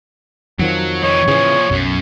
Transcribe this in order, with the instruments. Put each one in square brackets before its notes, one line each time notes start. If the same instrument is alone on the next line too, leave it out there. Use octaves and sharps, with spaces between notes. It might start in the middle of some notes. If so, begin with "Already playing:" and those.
[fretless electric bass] F2 D#3 F3 [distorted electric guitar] F#3
[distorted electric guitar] E3 D#4 [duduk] C#5
[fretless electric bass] C#3 E3 [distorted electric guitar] F3 G#4
[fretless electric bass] B1 [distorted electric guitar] F#2